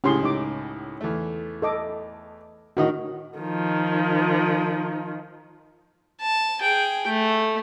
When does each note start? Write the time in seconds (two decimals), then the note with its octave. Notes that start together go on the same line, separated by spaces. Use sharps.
0.04 C#2 A2 C#4 G4 G#4 C6
0.23 D#4 D6
1.01 E2 A3
1.62 A4 D#5 D6
2.77 A2 D#3 F#4 D#5
3.39 D#3 F3
6.21 A5
6.60 G#4 G5
7.08 A3